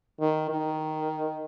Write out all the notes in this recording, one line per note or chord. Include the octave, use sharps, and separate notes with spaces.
D#3
D#3